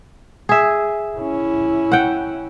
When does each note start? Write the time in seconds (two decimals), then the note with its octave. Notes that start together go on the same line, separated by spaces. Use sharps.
0.49 G#4 E5
1.17 C#4 E4
1.92 F#5 G5